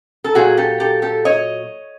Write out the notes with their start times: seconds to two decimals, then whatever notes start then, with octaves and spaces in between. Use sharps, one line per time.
0.24 A4
0.35 A#2 F#3 F#4 G#4
0.57 G4 A4
0.80 G4 A4
1.02 G4 A4
1.25 C#5 D#5